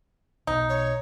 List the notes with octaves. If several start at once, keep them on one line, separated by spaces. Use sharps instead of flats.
B1 B2 D#4
C#5